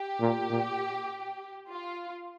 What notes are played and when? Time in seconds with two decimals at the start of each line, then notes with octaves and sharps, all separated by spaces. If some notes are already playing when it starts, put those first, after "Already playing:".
Already playing: G4
0.21 A#2
0.50 A#2
1.70 F4